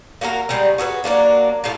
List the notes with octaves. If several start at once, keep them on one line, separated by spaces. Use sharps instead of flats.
A#3 F#4 G#4 A#4
C#3 G3 G#3 D#4
F#4 G#4 A4 B4
F#3 G3 A#3 D4
A2 F4 A4 F5